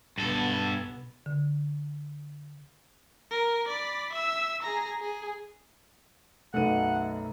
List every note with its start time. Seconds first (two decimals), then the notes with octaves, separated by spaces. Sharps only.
0.18 B1 G2 B2 B3 A4
1.26 D3
3.31 A#4
3.68 D5 B5
4.12 E5 E6
4.62 G#4 A#5
5.01 G#4
6.54 B1 F#2 A3 D#4 B4 F#5 D#7